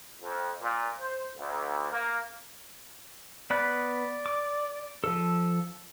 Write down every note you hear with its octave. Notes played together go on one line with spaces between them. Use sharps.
F2
A#2
C5
D2
A#3
B3 D5 B5 F#6
D6
F3 A4